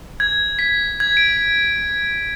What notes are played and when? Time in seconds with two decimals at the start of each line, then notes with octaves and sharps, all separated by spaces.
0.20 G#6
0.59 B6
1.00 G#6
1.17 D7